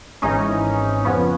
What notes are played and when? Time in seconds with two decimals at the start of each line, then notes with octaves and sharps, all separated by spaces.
0.22 G#1 G#2 E3 C#4 D#4
1.05 F2 C#3 F3 B3 C#4